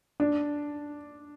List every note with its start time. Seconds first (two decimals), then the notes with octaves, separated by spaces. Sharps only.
0.20 D4